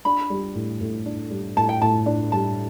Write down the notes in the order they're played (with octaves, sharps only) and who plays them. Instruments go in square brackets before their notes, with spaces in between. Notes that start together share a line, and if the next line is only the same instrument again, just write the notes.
[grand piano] D4 [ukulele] B5
[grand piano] G3
A2
A2
D4
G3
[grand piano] A2 [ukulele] A5
[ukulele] G5
[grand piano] A2 [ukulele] A5
[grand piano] D4
[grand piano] G3 [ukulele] A5